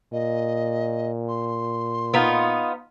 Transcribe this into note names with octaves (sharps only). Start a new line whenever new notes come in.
A#2 D#5
C6
B3 D#4 F4